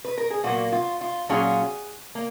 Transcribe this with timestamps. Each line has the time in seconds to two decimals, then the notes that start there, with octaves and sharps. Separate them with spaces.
0.05 B4
0.18 A#4
0.30 G#4
0.44 A#2 F#3 A#3 F#4
0.72 F4
1.01 F4
1.29 A#2 F#3 C#4 F4 G#4
2.15 A#3